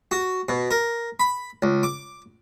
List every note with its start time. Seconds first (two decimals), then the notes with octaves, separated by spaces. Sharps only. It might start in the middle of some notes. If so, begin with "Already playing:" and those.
0.11 F#4
0.49 B2
0.71 A#4
1.20 B5
1.62 C#2
1.83 D6